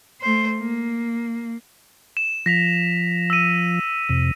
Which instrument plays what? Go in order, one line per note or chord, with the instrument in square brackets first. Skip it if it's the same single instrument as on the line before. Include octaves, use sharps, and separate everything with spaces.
[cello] A3 C5
A#3
[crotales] E7
[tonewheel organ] F3 [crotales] A#6 B6 F7
[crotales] E6 D#7
[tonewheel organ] F2 C3